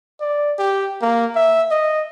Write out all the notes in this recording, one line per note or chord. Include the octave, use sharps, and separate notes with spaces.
D5
G4
A#3
E5
D#5